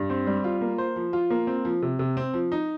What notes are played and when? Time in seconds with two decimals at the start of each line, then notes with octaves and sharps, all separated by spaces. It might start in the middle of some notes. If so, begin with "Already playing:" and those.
Already playing: G2
0.10 C4
0.27 G3
0.44 F4
0.61 A#3
0.78 C5
0.96 F3
1.13 F4
1.30 A#3
1.47 C4
1.65 F3
1.82 C3
1.99 C3
2.17 C4
2.34 F3
2.52 D#4